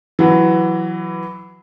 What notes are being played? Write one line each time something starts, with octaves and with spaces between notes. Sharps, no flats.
E3 F#3